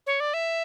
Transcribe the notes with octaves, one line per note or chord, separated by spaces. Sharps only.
C#5
D5
E5